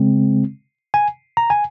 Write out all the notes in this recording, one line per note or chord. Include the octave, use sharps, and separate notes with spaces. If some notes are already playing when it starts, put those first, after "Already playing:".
Already playing: C#3 G#3 C4
G#5
A#5
G#5